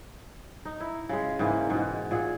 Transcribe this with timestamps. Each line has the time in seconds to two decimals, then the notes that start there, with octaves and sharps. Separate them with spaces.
0.65 D#4
0.80 E4
1.09 C#3 G#3
1.39 G#2 E3 A#3
1.70 G#2 B2
2.11 A#2 G#4 F#5